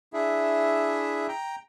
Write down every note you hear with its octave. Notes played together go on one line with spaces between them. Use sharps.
D4 E4 G#4 E5
G5 A#5